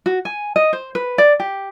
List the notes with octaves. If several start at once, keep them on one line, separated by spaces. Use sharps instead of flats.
F#4
G#5
D#5
C5
B4
D5
G4